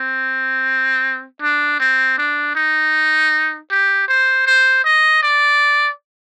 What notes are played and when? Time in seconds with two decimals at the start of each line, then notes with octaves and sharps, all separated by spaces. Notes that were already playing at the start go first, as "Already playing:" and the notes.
Already playing: C4
1.42 D4
1.80 C4
2.18 D4
2.55 D#4
3.71 G4
4.08 C5
4.46 C5
4.85 D#5
5.23 D5